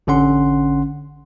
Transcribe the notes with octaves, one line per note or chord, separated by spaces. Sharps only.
A1 D3 C#4 F#5 C6